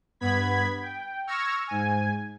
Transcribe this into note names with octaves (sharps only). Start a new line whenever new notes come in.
G2 B3 B5 G#6 B6
G5
C#6 E6 F6 G#6 A#6
G#2 G#5